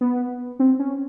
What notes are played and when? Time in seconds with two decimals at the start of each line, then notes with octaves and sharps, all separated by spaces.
0.01 B3
0.59 C4
0.79 C#4